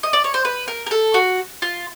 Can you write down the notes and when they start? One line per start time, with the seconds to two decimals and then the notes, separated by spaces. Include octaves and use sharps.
0.03 D#5
0.13 D5
0.24 C#5
0.34 C5
0.45 B4
0.68 A#4
0.86 A#4
0.91 A4
1.14 F#4
1.62 F4